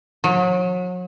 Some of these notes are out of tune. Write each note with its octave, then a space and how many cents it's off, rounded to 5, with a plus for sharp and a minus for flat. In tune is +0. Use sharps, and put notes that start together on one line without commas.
F#3 -35